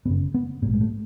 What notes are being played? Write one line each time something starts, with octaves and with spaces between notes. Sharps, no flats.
G1 F#2 C#3 B3
B3
A#1 G#2 A#3
G#3
A3